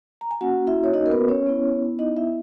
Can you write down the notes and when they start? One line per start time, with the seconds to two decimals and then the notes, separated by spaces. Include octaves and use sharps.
0.21 A#5
0.31 G#5
0.41 A#3 C#4 F#4 F#5
0.67 E4 E5
0.84 C#5
0.94 D#4 D#5
1.06 A#4
1.11 B3 B4
1.29 C#4 C#5
1.46 B3 E4
1.99 D#4 D#5
2.17 E4 E5